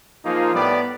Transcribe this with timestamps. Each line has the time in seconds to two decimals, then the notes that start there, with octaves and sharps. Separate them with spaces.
0.25 F3 A#3 D#4 F4 G#4
0.54 A2 G3 B3 D5